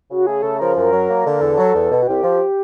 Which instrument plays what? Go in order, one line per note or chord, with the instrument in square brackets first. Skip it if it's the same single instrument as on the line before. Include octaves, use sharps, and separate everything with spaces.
[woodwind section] C#3 [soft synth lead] F#4
[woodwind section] A3 [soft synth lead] G#4
[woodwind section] C#3 [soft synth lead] A4
[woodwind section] F3 [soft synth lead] A#4
[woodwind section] F#2 [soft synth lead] A#4
[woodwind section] F#3
A#3
D3
[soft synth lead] A#4
[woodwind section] E2 [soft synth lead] A4
[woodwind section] F#3
E2
B2
[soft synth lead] F#4
[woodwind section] C2 [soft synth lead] G4
[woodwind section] F3